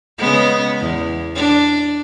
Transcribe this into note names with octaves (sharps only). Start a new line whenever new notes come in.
C#3 G#3 B3
E2
D4